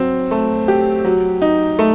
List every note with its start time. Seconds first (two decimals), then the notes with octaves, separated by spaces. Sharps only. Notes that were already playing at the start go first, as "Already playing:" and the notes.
Already playing: F#3 C4
0.31 A3
0.68 G4
1.04 F#3
1.42 D#4
1.79 A3